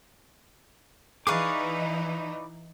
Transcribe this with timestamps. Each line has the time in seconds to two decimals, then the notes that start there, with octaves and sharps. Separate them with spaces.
1.27 E3 D#4 G#4 B4 D5 F5 C#6 D6